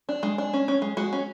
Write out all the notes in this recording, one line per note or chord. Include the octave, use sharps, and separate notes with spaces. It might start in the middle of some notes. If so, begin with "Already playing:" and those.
D4
G#3
D4
C#4
C#4
G#3
G#3 F#4
C#4